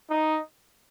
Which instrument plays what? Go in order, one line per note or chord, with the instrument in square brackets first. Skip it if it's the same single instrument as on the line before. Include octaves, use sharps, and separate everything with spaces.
[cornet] D#4